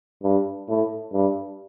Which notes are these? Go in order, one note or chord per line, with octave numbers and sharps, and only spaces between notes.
G2
A2
G2